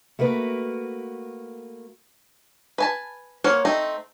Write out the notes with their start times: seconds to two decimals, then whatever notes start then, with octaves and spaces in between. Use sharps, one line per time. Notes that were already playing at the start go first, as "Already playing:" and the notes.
0.19 A3 A#3 F#4 B4
2.78 B4 G#5 A5
3.44 A#3 C5 C#5 F5 F#5
3.65 A3 C4 D#4